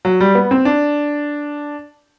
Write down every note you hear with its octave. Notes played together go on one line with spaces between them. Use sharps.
F#3
G3
B3
C4
D4